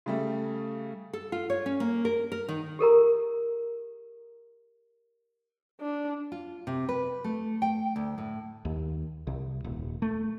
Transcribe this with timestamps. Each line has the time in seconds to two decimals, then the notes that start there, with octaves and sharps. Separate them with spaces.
0.06 C#3 G3 A3
1.13 A4
1.32 F4
1.50 C#5
1.66 C#4
1.80 A#3
2.05 A#4
2.32 A#4
2.48 D#3
2.79 G4 A4 A#4 A#5
5.81 D4
6.32 F4
6.67 C3
6.89 B4
7.24 A3
7.62 G5
7.96 D2
8.18 A2
8.65 D#2
9.27 C2
9.64 D#1
10.02 A3